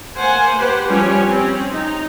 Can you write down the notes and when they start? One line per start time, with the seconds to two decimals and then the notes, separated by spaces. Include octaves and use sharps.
0.17 A#3 C5 F#5 G#5
0.58 G4 B4 C5 F#5
0.88 F3 G3 C#4 G4 C#5 G#5
1.27 C4 C#4
1.71 D#4